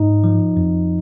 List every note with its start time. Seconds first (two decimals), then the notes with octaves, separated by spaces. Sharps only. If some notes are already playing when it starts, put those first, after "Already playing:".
Already playing: G#2 D#4
0.24 F3
0.57 F2